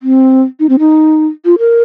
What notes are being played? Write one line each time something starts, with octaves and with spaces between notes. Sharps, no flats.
C4
D#4
C4
D#4
F4
A#4